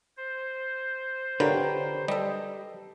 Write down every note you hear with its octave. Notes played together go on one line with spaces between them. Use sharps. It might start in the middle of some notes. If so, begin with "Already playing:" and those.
C5
D3 F4 G4 A#4 B4 C#5
G3 A4 D#5